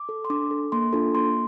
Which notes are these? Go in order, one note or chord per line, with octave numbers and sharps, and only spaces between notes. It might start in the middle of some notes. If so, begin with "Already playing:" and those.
Already playing: D6
A4
C6
D4 D6
A4
A#3 C6
D4 F4 A4
A#3 C6